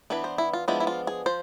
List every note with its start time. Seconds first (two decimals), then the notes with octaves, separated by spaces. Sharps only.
0.10 E3 B3 D4 B4
0.24 C5
0.38 E4
0.53 F4
0.68 F3 G#3 B3 D4 E4
0.80 E4
0.87 F4
1.07 G#4
1.26 F3 C5